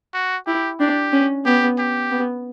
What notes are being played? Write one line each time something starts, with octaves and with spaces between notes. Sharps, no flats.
F#4
E4 G4
D4 G4
C#4
B3 G4
G4
B3